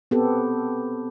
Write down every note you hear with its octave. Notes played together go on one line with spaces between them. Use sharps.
B3 C4 G4 A4